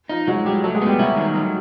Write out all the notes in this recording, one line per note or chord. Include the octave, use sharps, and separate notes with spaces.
F3 D#4 F4
F#3 G#3 F#4
G3 G#3 G4
F#3 A3 A4
G#3 G#4
B3
G3 G4
F#3 E4 F#4
D#3
F#3